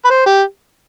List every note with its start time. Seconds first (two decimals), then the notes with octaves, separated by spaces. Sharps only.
0.05 B4
0.10 C5
0.26 G4